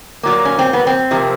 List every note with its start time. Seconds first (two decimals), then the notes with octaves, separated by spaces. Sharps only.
0.23 A#2 F#3 A#3
0.45 C#4
0.59 C4
0.73 B3
0.87 C4
1.11 C3 F3 A#3